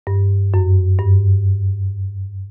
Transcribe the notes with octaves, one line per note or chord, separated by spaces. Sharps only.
G2
F#2
G2